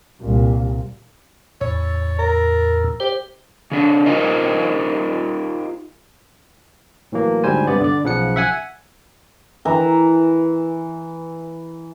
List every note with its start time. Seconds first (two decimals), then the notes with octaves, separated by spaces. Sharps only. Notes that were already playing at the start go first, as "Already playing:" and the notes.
0.21 C2 A#2
1.61 E2 A2 C#5
2.19 A#4
3.00 G4 C5
3.71 C#3 D4
4.06 D#4 F4 G4 A#4 C5 D#5
7.12 A2 E3 F#3 A#3
7.44 D2 G#2 G3 C5 G#5
7.67 G2 C3 B3 D5
7.80 D3 D5
8.04 B1 C#3 F3 F#5 C#7
8.36 E5 F#5 G#5
9.65 E3 A#5